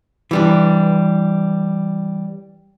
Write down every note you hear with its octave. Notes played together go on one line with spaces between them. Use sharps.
E3 G3 D4